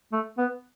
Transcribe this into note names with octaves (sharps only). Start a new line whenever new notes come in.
A3
B3